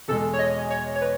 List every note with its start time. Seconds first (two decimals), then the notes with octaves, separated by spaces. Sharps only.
0.08 E2 B2 G#3 A4
0.33 C#5
0.39 D#5
0.71 C#5
0.96 C#5
1.01 B4